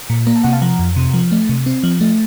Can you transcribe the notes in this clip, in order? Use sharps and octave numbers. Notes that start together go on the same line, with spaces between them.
A#2
A#3 A#5
A5
C3 F#5
F5 A5
F3 F#5 A#5
F2
C3
F3
A3
C3
C4
F3
A3